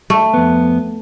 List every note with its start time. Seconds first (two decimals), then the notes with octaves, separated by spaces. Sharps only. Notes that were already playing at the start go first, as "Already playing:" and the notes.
0.10 A3
0.34 F2 B3